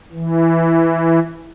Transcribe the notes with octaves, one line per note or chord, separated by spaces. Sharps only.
E3